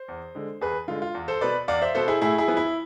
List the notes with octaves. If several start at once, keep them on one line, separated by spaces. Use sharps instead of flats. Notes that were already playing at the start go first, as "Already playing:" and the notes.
Already playing: C5
E2
D3 G#3
E2 G#4 B4
D3 G#3 F4
F4
E2
A4 C5
B2 B3 B4 D5
E2 D5 F5
C5 E5
B2 B3 A4 C5
E4 G#4
A2 E4 G#4
E4 G#4
F3 B3
E4